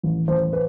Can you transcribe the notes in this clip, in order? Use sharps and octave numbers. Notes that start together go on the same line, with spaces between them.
A1
A1 C5
B4